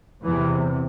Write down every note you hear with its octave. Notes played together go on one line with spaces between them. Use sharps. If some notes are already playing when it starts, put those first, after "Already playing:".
E2 C3 E3